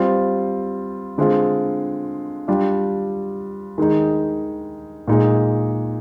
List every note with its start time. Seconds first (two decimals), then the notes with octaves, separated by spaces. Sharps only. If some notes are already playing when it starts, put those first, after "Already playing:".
Already playing: G3 C4 F4
1.18 D3 G#3 C4 F4
2.48 G3 D4 F4
3.78 D#3 G#3 D#4
5.08 A#2 G#3 D#4